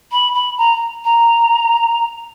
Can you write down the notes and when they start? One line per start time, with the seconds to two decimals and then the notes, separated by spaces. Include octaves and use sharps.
0.12 B5
0.35 B5
0.58 A#5
1.05 A#5